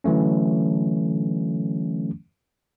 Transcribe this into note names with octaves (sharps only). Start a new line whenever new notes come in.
D3 E3 F#3 A3 C#4